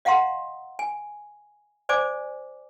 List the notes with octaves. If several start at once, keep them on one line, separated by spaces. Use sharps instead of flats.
D#5 F5 F#5 A#5 C6
G#5
C5 D5 G#5 D6